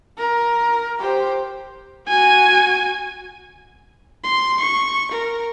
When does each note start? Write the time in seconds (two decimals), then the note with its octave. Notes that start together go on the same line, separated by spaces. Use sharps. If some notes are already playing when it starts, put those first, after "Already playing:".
0.18 A#4
1.00 G4 C5
2.08 F#4 G#5
4.24 C6
4.60 C#6
5.11 A#4